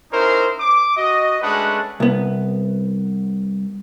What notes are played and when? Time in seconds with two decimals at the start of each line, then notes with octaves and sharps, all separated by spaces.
0.12 C#4 D#4 E4 A#4 C5
0.60 D6
0.96 F#4 D#5
1.42 G#3 A3 C#4 D4 B4 F#5
2.00 C2 B3